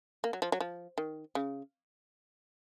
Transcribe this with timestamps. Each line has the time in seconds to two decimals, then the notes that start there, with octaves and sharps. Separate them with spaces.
0.24 A#3
0.33 F#3
0.42 F3
0.52 F#3
0.61 F3
0.98 D#3
1.35 C#3